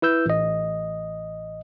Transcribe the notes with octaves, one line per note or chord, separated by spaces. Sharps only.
E4 B4 E6 G6
A1 D#5